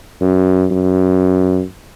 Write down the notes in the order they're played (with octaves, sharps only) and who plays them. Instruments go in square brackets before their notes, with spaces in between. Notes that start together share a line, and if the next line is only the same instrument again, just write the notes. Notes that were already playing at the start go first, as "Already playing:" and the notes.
[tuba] F#2
F#2